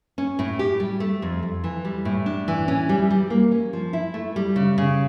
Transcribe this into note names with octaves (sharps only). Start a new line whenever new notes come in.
C#4
A2
G4
G3
A3
F2
F2
E3
G3
A2
D4
E3
C#4
G3
G3
A#3
C#4
F3
E4
A3
G3
C#3
C#3